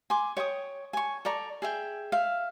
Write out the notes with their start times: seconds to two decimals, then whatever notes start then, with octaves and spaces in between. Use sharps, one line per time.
0.10 G#5 C6 D6
0.37 C#5 G5 C#6 D#6
0.93 G#5 C#6
1.25 A4 D5 A#5 C#6
1.62 G#4 E5 G5
2.12 E5 F5